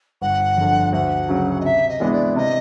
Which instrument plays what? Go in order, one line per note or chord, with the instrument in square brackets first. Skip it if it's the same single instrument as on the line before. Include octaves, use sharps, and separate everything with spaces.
[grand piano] G1 [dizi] F#5
[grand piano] F2 D3
[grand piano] D2 [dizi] F#5
[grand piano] C#3 F#3
[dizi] D#5
[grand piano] C3 [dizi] E5
[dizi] D#5
[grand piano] E3 G#3 B3 D4
[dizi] D5
[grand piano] C3 [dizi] D#5